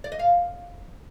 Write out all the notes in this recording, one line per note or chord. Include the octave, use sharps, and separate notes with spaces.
D5
D#5
F5